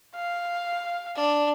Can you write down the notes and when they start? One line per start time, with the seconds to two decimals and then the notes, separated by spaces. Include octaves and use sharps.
0.15 F5
1.15 D4